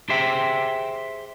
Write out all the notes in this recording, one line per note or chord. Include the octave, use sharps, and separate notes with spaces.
G4 G#4 C5 E5 G5